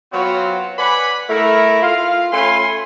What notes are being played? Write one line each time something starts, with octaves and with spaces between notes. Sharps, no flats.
F#3 B3 C4 F4 F#4 C#5
B4 D5 F#5 G#5 B5
A3 E4 A#4
F4 F5
A3 C#4 G#5 B5 C6